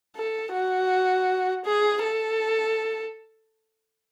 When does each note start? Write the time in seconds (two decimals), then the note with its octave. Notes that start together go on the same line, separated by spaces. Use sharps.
0.16 A4
0.53 F#4
1.65 G#4
2.03 A4